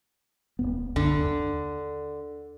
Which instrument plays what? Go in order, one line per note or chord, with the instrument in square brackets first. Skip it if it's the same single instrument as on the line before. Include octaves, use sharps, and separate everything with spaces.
[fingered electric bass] D#1 F#2 B3
[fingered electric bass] C2 F#2 [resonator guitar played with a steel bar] D3
[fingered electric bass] D#2